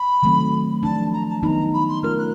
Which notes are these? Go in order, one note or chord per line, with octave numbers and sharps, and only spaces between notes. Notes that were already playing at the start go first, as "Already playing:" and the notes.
Already playing: B5
D#3 F#3 A3 C4
F3 A3 D4 A5
A#5
A5
D#3 F#3 B3 D#4 A#5 B5
B5
C6
A3 C#4 F4 A#4 F6
F#6